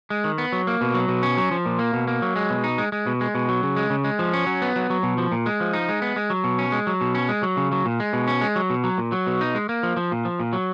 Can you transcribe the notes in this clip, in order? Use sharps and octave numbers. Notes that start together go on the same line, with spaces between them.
G#3
D#3
B3
F#3
A#3
B2
F#3
B2
C#4
F#3
F3
A#2
A#3
B2
A#3
F#3
G#3
B2
D#4
G#3
G#3
B2
G#3
B2
F#3
C#3
G#3
C#3
G#3
F3
C#4
F#3
B3
F#3
F#3
B2
F3
A#2
G#3
F3
D#4
G#3
B3
G#3
F#3
B2
C#4
G#3
F#3
B2
C#4
G#3
F#3
C#3
F#3
A#2
G#3
B2
C#4
G#3
F#3
B2
F#3
A#2
F#3
B2
D#4
G#3
A#3
F3
F3
A#2
F3
A#2
F#3